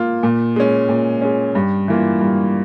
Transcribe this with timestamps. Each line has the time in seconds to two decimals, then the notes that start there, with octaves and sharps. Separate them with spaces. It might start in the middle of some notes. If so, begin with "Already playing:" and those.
Already playing: A#3 F4
0.23 A#2
0.56 G#3 C#4
0.89 A#2
1.21 G#3 C#4
1.55 G2
1.88 E3 A#3 F4
2.21 G2